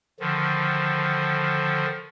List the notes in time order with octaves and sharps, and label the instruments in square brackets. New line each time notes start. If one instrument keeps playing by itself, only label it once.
[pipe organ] D3 D#3 F3